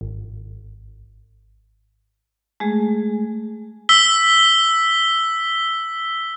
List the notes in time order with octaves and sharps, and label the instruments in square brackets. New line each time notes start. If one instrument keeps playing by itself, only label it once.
[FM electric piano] G#1
[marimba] G#3 A3 G#4
[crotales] E6 B6 G7